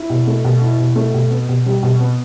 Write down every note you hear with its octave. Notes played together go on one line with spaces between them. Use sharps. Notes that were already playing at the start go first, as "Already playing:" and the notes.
Already playing: E4
B2
A3
B2
E4
B2
A3
B2
B3
B2
G3
B2
B3